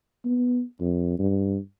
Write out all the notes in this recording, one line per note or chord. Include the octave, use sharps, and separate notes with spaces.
B3
F2
G2